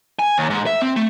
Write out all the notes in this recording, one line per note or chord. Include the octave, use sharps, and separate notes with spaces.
G#5
D#2
G#2
E5
C4
A3